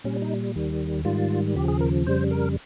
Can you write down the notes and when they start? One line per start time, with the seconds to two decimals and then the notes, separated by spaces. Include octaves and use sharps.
0.04 A#2 G3 C#4
0.22 D#4
0.55 D#2 D#3 G3
1.05 G#2 D#3 G3 F4
1.56 D#2 C#3 F3 G4
1.68 G#4
1.80 A#4
2.07 F2 C#3 G3 C5
2.31 A#4